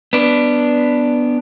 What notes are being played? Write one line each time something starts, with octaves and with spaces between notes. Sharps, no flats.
B3 D4